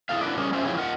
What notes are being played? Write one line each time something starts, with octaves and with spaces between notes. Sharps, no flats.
E4 F4 G#4 A4 F5
D4 E4 F#4 A#4 B4 D5
G3 C#4 G4 G#4 A#4 C#5
C#4 F4 G4 A4 C5 E5
F3 F#3 E4 G4 G#4 C#5
F4 A#4 D#5 F#5